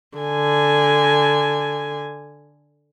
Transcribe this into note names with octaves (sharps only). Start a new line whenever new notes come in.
D3 G#5